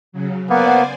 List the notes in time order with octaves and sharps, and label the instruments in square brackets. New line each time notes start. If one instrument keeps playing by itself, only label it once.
[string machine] C#3 F#3
[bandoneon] A#3 [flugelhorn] B3 [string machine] C5 D5 G#5 [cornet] F#5